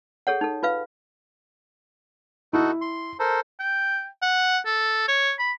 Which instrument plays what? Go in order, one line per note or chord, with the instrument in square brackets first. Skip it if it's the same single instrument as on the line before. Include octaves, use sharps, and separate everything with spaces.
[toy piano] G#4 A4 C#5 F#5
D#4 A4
F4 B4 F5
[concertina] D#4 F#4 A4 [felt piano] E4
[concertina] C6
A4 A#4 C5
[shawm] G5
F#5
A4
C#5
B5